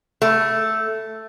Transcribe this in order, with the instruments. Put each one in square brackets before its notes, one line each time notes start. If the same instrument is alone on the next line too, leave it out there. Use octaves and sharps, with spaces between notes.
[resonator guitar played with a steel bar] A3